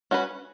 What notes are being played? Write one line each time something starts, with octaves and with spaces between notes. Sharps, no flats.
C#4 F#4 B4